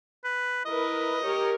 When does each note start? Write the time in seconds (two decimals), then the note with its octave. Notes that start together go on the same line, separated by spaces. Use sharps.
0.24 B4
0.65 E4 A#4 B4 D#5
1.25 G4 A#4 C#5